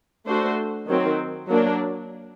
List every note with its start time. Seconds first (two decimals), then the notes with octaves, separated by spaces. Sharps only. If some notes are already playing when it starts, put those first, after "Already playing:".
0.26 A3 D4 F#4 A4 C5
0.87 D#3 F#3 C4
1.48 F#3 A#3 D4